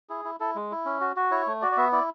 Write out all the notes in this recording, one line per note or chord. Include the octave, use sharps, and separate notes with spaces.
E4 G#4
E4
E4 A4
G#3
E4
C#4
F#4
F#4
E4 C#5
A3
F#4 D5
D5
B3 E5
E4 D5